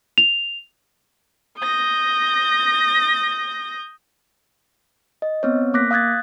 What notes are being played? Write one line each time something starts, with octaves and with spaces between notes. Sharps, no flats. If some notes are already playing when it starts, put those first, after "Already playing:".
F7
D#6 G6 A#6
D#5
B3 C4 C#5
A#3 D6 F#6 A#6 B6
F5 D#6 F#6 G#6 A6